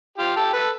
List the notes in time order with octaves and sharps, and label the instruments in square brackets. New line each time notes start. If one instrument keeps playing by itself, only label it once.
[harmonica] F4 G4
G4 A4
A4 B4